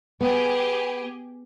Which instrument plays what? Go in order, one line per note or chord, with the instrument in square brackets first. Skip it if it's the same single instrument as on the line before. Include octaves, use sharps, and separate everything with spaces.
[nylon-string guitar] B3 [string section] G4 G#4